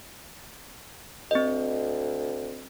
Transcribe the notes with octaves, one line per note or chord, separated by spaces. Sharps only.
D2 C4 D#5